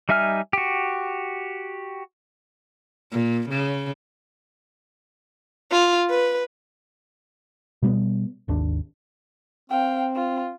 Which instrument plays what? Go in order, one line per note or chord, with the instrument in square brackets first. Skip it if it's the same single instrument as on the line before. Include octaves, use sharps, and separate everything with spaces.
[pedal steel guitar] G3 D#4 E5 G#5 F6
F#4 G4
[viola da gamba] A#2
C#3
[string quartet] F4
B4
[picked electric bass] B2 G3 A#3 B3
G#1 D#2 D4
[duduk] C4 [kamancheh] F5 G5
[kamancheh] F4